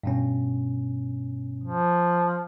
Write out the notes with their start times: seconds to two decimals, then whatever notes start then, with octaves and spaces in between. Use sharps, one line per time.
0.03 G2 B2 C#4
1.64 F3